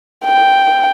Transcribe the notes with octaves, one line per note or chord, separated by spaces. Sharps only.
G5